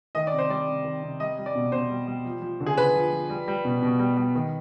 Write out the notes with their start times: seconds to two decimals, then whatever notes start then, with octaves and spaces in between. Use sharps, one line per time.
0.15 D#3 D#5
0.27 D5
0.32 C3
0.38 C5
0.49 G3 D5
0.68 C3
0.84 D#3
1.03 C3
1.20 G3 D#5
1.38 G3
1.46 D5
1.55 B2
1.72 B2 C5
1.90 G3
2.07 G3
2.25 F3
2.42 F3
2.60 D3
2.66 G#4
2.77 D3 B4
2.95 F3
3.12 F3
3.30 G3
3.48 G3
3.65 B2
3.82 B2
3.99 G3
4.17 G3
4.35 D#3